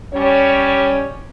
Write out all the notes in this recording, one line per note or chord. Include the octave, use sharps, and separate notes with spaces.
G3 C#4 C#5